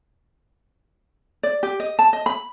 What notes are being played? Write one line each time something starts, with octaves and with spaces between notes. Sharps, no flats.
D5
G4
D#5
A5
D#5
B5